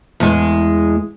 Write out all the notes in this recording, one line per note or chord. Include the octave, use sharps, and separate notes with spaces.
E2 G#3